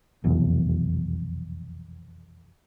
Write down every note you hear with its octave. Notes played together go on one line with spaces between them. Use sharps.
F1 B1 E2